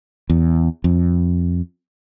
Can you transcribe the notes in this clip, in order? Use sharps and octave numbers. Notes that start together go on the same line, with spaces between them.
E2
F2